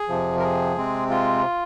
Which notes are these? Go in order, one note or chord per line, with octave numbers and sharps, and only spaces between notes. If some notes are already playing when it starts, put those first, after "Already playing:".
Already playing: G#4
F2 C3 F3
A#4
G#4
C3 G#3 C4
F4